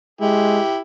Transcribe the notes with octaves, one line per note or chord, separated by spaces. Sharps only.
G#3 E4 G4